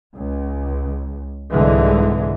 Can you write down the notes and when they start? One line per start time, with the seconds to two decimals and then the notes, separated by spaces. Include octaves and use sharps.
0.15 C#2
1.52 C2 G#2 D3 E3 G#3